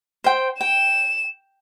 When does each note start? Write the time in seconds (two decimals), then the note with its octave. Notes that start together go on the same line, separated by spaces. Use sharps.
0.24 C5 G5
0.61 G5 E7